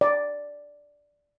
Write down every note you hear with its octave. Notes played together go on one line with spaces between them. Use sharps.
D5